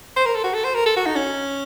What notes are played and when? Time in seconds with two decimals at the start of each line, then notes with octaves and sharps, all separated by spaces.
0.17 C5
0.26 A#4
0.35 A4
0.44 F#4
0.54 A4
0.64 C5
0.75 A#4
0.86 A4
0.96 F#4
1.06 D#4
1.16 C#4